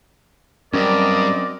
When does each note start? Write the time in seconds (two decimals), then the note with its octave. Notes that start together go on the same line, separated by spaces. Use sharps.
0.74 G2 F#3 C4 C#4 A#4 D5 D#5